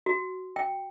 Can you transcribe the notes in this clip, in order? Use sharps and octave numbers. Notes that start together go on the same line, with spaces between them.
F#4
G5